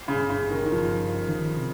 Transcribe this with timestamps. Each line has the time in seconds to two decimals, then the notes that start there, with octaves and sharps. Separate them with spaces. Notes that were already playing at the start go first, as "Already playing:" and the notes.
Already playing: G1
0.08 C#3
0.15 G2
0.30 C#3
0.43 G1
0.50 D#3
0.66 D#3
0.72 G2 F3
1.01 G1
1.28 D#3
1.57 C3